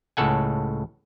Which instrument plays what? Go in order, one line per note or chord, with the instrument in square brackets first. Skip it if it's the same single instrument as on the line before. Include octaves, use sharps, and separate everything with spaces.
[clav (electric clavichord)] C#2 A2 C#3 A4 F#5 G#5